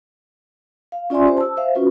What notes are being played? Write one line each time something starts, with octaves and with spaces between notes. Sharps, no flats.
F5
C#4 F4 D5 E5 G#5 C6
G4 C5
A5 E6
C5 E5 F5
C#4 F4 F#4 B4